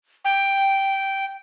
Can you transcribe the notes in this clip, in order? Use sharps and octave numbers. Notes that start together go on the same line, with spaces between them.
G5